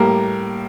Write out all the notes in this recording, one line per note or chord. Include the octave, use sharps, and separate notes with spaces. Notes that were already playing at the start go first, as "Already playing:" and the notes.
Already playing: A2 G3 A#3 A#4